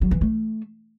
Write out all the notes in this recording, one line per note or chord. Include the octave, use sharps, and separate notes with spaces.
F#3
E3
A3